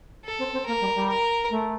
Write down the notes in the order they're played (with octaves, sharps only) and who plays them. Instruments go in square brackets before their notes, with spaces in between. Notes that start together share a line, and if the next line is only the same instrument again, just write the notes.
[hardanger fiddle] A4
[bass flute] C4
C4
[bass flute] A#3 [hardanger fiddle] A#4
[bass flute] G3
G3
[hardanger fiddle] A#4
[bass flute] A3